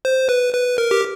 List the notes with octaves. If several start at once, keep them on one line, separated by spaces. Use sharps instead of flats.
C5
B4
B4
A#4
G4